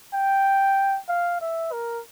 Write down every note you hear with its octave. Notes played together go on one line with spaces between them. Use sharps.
G5
F5
E5
A#4